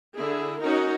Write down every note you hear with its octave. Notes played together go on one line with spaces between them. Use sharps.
D3 E4 G#4
C#4 D#4 F#4 A#4